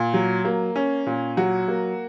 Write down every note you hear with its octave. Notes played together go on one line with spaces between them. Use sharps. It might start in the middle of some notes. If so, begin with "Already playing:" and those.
Already playing: A#2
F#3
A#3
C#4
A#2
F#3 F#4
A#3